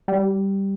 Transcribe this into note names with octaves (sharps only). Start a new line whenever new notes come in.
G3